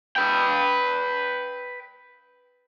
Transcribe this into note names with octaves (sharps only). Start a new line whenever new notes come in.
B4 G5